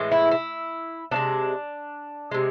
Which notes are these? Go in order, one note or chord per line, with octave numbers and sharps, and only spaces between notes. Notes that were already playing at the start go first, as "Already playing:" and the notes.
Already playing: A2 E3 G#3
E4
E4
C3 F3 G#3 D4
C3 G#3